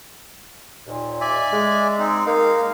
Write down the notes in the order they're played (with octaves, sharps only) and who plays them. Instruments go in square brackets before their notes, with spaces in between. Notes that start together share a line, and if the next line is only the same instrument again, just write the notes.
[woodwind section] D#2 A#2
[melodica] D5 E5 G#5
[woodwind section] G#3
[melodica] C4 D#4
[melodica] G#3 D#4 F5 [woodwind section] A#3 A#4